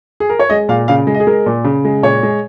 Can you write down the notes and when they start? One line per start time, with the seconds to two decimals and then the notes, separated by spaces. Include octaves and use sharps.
0.20 G#4
0.30 A#4
0.39 C#5
0.50 G#3 D#5
0.69 A#2 F5
0.88 C#3 F5
1.07 G#3
1.15 D#5
1.20 G#4
1.27 G#3 A#4
1.46 A#2
1.64 C#3
1.85 G#3
2.03 A#2 C#5
2.23 G#3